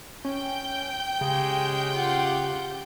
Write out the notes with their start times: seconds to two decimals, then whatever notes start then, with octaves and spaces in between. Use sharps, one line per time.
0.25 C#4 G5 G6
1.21 C#3 G#3 G4
1.94 F4 F#5